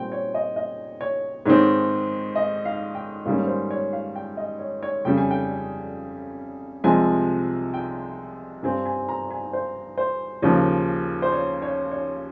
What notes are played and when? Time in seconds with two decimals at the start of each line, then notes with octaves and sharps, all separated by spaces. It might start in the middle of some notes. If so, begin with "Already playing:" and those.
Already playing: A#2 G3 C4 G5
0.12 C#5
0.34 D#5
0.56 D#5
1.01 C#5
1.46 G#2 D#3 G#3 C4 C#5
2.36 D#5
2.65 F5
2.95 G5
3.25 G#2 D#3 G3 A#3 C#4 F5
3.47 C5
3.70 C#5
3.93 F5
4.15 G5
4.37 D#5
4.59 C#5
4.83 C#5
5.05 F2 C#3 G3 C#4 G5
5.17 G#5
5.31 G5
6.84 C2 C3 F3 G#3 G#5
7.74 G5
8.63 G2 G3 C4 G#5
8.85 G#5
9.09 A#5
9.31 G#5
9.53 C5
9.98 C5
10.42 D#2 C#3 F3 A#3
11.22 C5
11.32 C#5
11.62 C#5
11.92 C#5